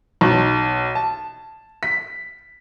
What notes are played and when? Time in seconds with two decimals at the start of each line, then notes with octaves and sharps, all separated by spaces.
0.21 B1
0.95 A5
1.83 B6